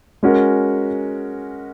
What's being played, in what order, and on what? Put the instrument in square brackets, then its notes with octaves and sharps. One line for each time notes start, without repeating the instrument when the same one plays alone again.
[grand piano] G#3 C#4 F#4 A#4